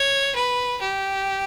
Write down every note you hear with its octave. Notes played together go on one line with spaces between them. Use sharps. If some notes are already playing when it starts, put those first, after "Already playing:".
Already playing: C#5
B4
G4